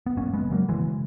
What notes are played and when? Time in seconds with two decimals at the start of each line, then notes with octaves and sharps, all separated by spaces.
0.06 B3
0.17 F#2 A#3 C#4
0.33 G#3 B3
0.43 F#1
0.51 F#3 A#3
0.68 C#3 E3 G#3